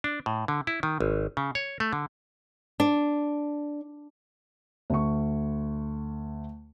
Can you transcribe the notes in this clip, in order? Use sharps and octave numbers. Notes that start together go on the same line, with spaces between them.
D4
A2
D3
E4
D#3
G#1
C#3
C#5
A3
D3
D4
D2 C#6